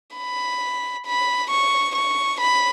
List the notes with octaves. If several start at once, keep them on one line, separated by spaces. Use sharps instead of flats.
B5
B5
C#6
C#6
B5